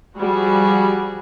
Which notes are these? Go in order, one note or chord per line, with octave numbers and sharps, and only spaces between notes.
F3 G3 F#4 G#4